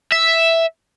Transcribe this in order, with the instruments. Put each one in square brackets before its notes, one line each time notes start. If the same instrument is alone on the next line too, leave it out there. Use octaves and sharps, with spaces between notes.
[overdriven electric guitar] E5